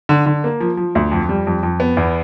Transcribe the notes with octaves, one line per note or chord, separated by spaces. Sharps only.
D3
D3
A#3
F3
F3
D2
F2
G3
F2
F2
B3
E2